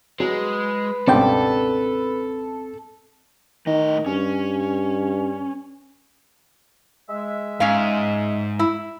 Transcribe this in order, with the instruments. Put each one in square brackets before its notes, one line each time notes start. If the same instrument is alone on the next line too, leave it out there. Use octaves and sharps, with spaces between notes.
[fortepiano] F#3 [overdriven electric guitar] G#3 [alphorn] B4
[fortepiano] C#2 G2 B2 [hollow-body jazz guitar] C4 D5 G5 [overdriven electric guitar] A4
[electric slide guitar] A2 D#5 [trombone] D#3
[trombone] G2 [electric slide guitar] C#4
[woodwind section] G#3 E5
[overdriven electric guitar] G#2 [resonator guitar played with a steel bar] C#4 F5
[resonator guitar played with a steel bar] E4